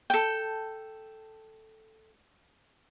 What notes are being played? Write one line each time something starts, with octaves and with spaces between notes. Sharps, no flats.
A4 G5